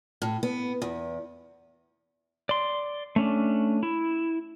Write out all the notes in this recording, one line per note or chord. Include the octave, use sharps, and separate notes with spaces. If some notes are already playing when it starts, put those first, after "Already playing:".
A2
B3
E2
D5 C6
A3 C#4 D4
E4